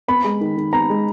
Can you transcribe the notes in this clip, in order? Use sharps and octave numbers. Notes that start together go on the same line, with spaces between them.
B3 B5
G#3
D#3
D#3
B3 A#5
G#3